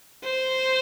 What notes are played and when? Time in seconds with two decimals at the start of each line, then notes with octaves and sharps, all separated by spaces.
0.25 C5